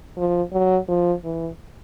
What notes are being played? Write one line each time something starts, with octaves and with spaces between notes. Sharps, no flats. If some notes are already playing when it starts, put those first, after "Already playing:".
F3
F#3
F3
E3